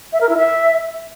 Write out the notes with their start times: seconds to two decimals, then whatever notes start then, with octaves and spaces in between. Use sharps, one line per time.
0.12 E5
0.21 A#4
0.29 E4
0.38 E5